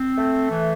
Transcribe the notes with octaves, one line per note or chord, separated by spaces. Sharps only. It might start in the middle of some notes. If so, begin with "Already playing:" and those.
Already playing: C4
A3
E3